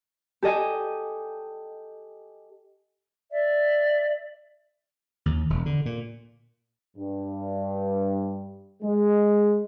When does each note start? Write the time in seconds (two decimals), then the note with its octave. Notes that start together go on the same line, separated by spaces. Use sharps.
0.43 G4 A4 D#5 G5 G#5
3.31 D5 E5
5.26 D#2
5.50 E1
5.66 D3
5.86 A#2
6.97 G2
8.83 G#3